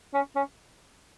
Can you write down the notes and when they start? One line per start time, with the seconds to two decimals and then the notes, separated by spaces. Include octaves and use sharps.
0.14 C#4
0.36 C#4